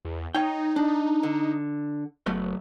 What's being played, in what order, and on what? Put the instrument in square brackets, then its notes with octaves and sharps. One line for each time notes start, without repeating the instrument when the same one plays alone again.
[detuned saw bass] E2
[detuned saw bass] D#4 [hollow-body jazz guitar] C#5 G5
[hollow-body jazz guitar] D4
D3
[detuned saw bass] F#1 [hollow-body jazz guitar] F#3 A3 B3